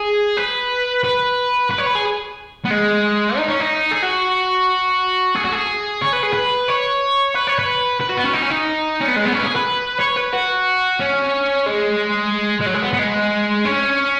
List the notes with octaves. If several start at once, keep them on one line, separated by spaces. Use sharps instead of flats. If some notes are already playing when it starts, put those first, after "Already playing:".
Already playing: G#4
B4
B4
B4
C#5
B4
G#4
B3
G#3
D#4
C#4
D#4
G#4
F#4
G#4
F#4
G#4
C#5
B4
G#4
B4
C#5
B4
C#5
B4
B4
F#4
B3
C#4
D#4
C#4
D#4
C#4
B3
G#3
B3
C#4
B4
G#4
B4
C#5
B4
F#4
C#4
G#3
G#3
F#3
G#3
B3
B3
G#3
C#4